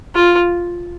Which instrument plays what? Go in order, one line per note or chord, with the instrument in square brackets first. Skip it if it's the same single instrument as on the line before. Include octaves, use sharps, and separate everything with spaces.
[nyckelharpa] F4